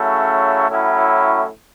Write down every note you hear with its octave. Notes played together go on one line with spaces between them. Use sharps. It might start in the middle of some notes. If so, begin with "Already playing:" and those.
Already playing: C#3 F#3 A3 C#4 E4
A2 F#3 C#4 E4